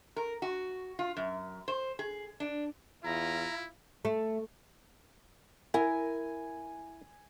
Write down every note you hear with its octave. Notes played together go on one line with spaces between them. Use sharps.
A#4
F#4
F4
F#2
C5
G#4
D4
E2 E4 F4 A#5
A3
E4 A#4 G#5